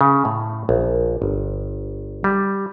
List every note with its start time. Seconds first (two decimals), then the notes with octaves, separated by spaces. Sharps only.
0.01 C#3
0.25 A2
0.69 A#1
1.22 G1
2.24 G3